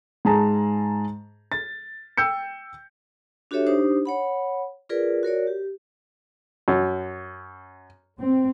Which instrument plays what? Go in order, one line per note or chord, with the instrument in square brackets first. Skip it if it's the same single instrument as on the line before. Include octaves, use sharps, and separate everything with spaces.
[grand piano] G#2 G#4 A5 A#5
A6
G5 E6 G6 C#7
[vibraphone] D4 F#4 G4 A4 C#5 E5
D4 D#4 G4 C5 D#6
C#5 F#5 B5
F4 G#4 A#4 B4 D5
F#4 A#4 C#5 D5
G4
[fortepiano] F#2
[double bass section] C4